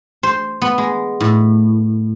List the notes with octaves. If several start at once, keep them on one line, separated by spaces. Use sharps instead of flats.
C5
B3
G#3
A2